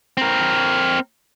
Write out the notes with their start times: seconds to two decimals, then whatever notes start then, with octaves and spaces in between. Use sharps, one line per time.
0.17 C4 A#4